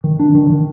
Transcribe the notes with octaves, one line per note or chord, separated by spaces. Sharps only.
D#3
D4
D#3
D#3